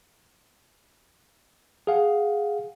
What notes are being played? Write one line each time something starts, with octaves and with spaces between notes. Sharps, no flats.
G#4 F5 F#5